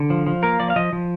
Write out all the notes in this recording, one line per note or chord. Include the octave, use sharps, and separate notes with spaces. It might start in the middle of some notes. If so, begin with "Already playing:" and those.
Already playing: D3
F3
F3
A#3 A#4
F3 D5
F5
F3 D#5
F3